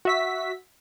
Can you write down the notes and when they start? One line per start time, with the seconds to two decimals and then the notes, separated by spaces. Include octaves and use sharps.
0.05 F#4 E5 B6